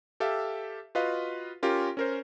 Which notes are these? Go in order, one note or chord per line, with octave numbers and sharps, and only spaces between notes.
G4 A4 E5 F5
F4 F#4 B4 D#5 F5
C#4 F4 G4 A#4
C#4 A#4 C5